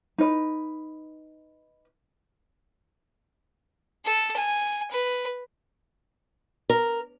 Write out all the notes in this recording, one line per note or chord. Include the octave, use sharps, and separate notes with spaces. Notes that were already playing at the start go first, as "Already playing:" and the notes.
D#4 B4
A4
G#5
B4
A#4